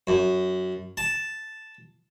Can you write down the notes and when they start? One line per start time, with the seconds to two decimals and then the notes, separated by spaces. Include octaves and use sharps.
0.07 F#2
0.97 A5